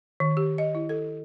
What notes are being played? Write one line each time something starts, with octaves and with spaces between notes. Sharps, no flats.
D#3
G4
D#5
E4
A4